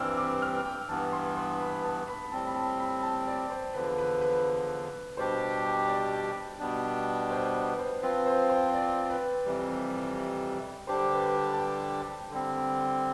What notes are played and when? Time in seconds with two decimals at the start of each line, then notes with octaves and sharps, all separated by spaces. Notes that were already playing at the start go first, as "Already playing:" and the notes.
Already playing: G2 E3 G3 C4 E6 F6
0.17 D6
0.42 F6
0.65 G5
0.89 G2 E3 B3 A5
1.13 C6
1.37 C6
1.60 B5
1.84 A5
2.08 B5
2.32 A2 G3 C4 A5
2.47 B5
2.56 A5
2.80 B5
3.03 A5
3.27 D5
3.50 C5
3.74 E2 D3 F3 B4
3.98 B4
4.21 B4
5.17 B2 G3 D4 G4 C5
5.88 D5
6.60 B2 G3 B3 D4
7.31 C5
7.54 B4
7.79 C5
8.02 F3 C4 F4 B4
8.26 C5
8.49 C5
8.74 D5
9.10 B4
9.45 F2 C3 E3 G3
10.87 D3 G3 D4 G4 C5
11.12 B4
11.35 B4
11.53 A5
11.59 G5
12.30 D3 G3 C4